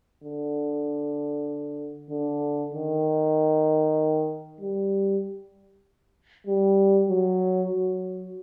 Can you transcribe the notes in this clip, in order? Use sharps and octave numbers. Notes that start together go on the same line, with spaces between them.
D3
D3
D#3
G3
G3
F#3
F#3